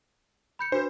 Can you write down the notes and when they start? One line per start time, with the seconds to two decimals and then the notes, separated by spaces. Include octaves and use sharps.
0.59 B5 G6 C#7
0.72 D4 F#4 B4 C5